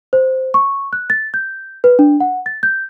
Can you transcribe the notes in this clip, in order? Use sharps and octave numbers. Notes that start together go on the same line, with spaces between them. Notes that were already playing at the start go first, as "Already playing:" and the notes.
C5
C#6
F#6
A6
G6
B4
D4
F#5
A6
G6